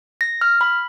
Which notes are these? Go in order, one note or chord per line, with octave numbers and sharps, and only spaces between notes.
A#6
F6
B5